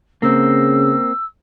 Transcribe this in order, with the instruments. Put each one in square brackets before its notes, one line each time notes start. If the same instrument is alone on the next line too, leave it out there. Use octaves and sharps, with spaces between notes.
[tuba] C#3 [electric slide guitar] A#3 C4 [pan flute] E6